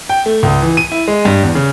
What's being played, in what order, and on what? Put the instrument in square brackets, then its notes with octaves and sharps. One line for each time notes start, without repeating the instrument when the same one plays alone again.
[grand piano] G5
A3
C#2
E3
D#7
E4
G#3
G2
E2
C#3